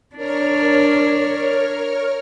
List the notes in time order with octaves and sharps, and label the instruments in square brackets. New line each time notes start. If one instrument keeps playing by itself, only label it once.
[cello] D4 [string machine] A#4 C#5 F6